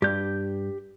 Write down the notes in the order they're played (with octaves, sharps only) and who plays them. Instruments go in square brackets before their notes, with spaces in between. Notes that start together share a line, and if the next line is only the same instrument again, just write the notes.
[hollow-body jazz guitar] G2 [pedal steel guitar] G4 G6